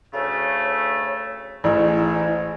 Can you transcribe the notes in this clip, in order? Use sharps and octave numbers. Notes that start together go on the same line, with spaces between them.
D2 C#3 A3 C#5
A1 G#2 E4 G#5